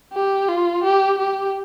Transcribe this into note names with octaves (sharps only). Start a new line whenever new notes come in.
G4
F4
G4
G4